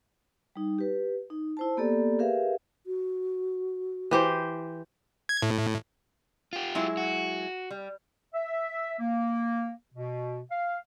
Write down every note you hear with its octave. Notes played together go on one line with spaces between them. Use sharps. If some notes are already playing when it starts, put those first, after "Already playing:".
G3 D#4
G4 B4
D#4
E4 C5 A5
A#3 B3 G4 A4 D5
G4 G#4 A#4 B4 E5 F5
F#4
E3 G4 C5
G#6
A2
F4 G4
F#3 G#3 E4
F#4
G3
E5
A#3
B2
F5